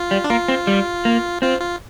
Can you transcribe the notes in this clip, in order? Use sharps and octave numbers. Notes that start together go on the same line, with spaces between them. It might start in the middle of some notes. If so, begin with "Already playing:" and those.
Already playing: F4
G3
D4
A#3 F4
C4
G3
A#3
C4 F4
F4